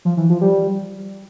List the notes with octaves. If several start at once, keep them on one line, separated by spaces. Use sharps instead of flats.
F3
E3
F3
G3